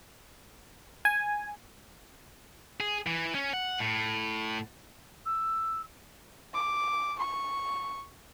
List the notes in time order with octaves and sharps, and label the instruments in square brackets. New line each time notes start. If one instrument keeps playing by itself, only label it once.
[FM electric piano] G#5
[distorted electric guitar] G#4
E3
C#4
F#5
A2
[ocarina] E6
[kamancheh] D6
C#6